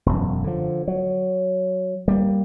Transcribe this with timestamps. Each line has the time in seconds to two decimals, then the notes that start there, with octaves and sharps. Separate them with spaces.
0.06 E1 F#2
0.44 D3 F3
0.88 F#3
2.08 G3 A#3